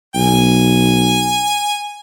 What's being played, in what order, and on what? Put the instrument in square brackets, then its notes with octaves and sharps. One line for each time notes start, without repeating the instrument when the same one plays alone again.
[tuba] B1 [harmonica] G#5